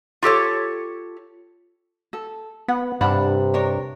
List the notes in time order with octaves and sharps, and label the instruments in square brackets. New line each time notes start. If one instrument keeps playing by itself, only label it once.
[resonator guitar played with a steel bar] F4 G4 A4 C#5
[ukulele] A4
[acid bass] B3 [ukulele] F#5
[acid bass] G2 [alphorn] C3 [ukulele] D4 F#5 B5
[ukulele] D4 A#4 C#5